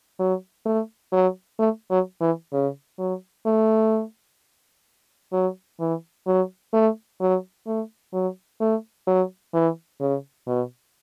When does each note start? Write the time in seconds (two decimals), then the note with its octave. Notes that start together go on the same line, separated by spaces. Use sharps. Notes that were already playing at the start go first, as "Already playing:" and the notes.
0.19 F#3
0.66 A3
1.13 F#3
1.59 A3
1.91 F#3
2.21 E3
2.53 C#3
2.99 F#3
3.46 A3
5.33 F#3
5.80 E3
6.27 F#3
6.74 A3
7.21 F#3
7.67 A3
8.13 F#3
8.61 A3
9.07 F#3
9.54 E3
10.01 C#3
10.47 B2